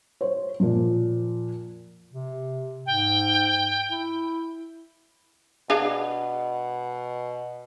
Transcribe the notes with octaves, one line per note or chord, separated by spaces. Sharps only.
C5 C#5
A#2 F3
C3
G#2 G5
E4
B2 D4 G#4 F5